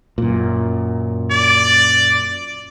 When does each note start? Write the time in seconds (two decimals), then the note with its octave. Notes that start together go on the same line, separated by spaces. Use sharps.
0.18 F#2 A#2
1.31 D5